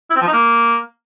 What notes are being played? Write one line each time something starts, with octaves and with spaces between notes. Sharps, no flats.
E4
C4
F3
D#4
A#3